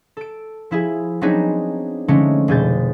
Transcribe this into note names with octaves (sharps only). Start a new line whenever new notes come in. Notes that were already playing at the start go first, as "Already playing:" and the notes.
A4 D7
F3 E4 G#4
F#3 B3 C4 D4 D#4 G#4
D3 F3 G#3 A3 C#4 D#4
F1 B2 G#4 C5 G6 A6